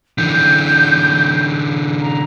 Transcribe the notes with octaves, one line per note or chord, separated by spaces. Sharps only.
D3 E3 G6
A#5